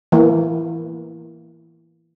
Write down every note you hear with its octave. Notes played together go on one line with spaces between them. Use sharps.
E3 A#3